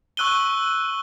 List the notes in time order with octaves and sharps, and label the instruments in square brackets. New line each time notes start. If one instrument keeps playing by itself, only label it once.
[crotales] C#6 E6 F#6 D#7 G7